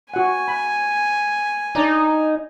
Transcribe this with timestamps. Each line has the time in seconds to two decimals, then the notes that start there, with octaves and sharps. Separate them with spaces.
0.14 F#4 F#5 G#5
0.48 B5
1.75 D4 D#4 D5 A#5